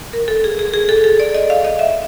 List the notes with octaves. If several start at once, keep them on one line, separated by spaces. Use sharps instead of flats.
A#4
A4
G#4
G#4
G#4
A4
A4
D5
D#5
F5
D#5
E5